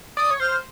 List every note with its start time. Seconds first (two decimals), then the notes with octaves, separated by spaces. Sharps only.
0.17 D5 D#6
0.31 C#5
0.40 C5 F6